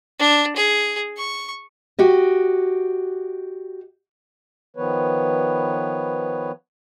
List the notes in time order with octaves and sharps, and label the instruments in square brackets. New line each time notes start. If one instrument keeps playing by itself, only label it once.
[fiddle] D4
G#4
C#6
[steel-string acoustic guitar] F#4 G4 D#5
[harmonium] D#3 F3 B3 B4 C#5